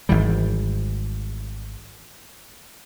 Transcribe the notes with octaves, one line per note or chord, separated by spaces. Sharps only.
G#1 E3 G3